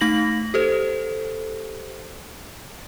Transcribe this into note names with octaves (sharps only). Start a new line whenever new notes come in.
A3 D#4 A#6 F#7
G4 A4 C5